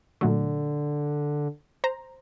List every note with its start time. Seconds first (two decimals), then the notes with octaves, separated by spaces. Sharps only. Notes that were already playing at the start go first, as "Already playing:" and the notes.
0.21 A#2 D3 F#3 A3
1.84 C5 A#5